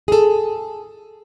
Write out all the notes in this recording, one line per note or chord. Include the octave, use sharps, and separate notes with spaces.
G#4 A4